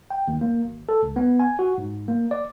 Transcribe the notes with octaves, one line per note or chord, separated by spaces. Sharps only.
G5
D#2
A#3
G#1
A4
C#2
B3
G#5
F#4
G#2
A#3
D5